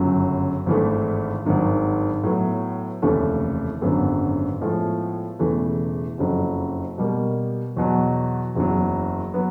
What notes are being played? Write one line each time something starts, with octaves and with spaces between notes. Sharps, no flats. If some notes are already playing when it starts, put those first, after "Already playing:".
Already playing: G1 F#2 C#3 F#3
G#1 G2 E3 A3
G#1 G2 D#3 F#3
A2 F#3 B3
F1 D#2 C#3 E3 A3
G#1 F#2 D3 F#3 B3
A2 F3 G#3 B3
E1 E2 C#3 E3 A3
F#1 F2 C#3 F#3
B2 G3 A#3
E2 B2 F#3
F#1 E2 C#3 F#3
F#3 B3